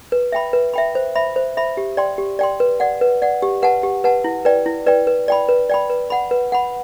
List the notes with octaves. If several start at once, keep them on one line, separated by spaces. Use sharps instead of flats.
B4
E5 G5 B5
B4
E5 G5 B5
C5
E5 B5
C5
E5 B5
G4
D5 G5 C6
G4
D5 G5 C6
B4
D5 F#5
B4
D5 F#5
G4
B4 F#5 A5
G4
B4 F#5 A5
E4
B4 D5 G5
E4
B4 D5 G5
B4
D5 G5 B5
B4
D5 G5 B5
B4
F#5 B5
B4
F#5 B5